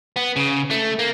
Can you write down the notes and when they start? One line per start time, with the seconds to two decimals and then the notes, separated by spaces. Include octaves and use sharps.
0.16 B3
0.36 C#3
0.71 A3
0.99 A#3